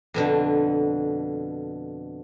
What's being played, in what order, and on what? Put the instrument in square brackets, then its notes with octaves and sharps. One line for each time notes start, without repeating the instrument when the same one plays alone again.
[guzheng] F2 B2 D3